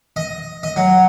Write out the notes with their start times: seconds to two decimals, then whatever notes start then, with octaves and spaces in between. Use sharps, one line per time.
0.16 D#5
0.63 D#5
0.76 F#3